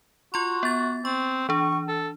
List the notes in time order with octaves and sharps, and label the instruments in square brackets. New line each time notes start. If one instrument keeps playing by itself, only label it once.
[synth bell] F4 C6 [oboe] F#4
[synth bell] B3 A6
[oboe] C4 [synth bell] C#6
[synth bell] E3 D4 [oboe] C#6
[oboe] A4